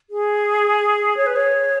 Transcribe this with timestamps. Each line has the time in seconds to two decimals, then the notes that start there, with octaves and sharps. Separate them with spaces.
0.10 G#4
1.17 C#5
1.26 B4
1.36 C#5